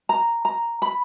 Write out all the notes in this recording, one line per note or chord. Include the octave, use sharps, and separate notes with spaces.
A#5
A#5
B5